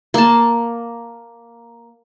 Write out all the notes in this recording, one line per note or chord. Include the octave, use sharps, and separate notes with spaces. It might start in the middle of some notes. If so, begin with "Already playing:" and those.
A#3 A5